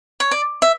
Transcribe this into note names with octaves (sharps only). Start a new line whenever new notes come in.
C#5
D5
E5